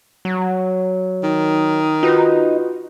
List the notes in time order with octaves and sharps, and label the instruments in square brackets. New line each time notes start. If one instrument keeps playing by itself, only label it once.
[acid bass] F#3
[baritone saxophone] D#3
[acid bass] D#4 [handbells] F4 F#4 B4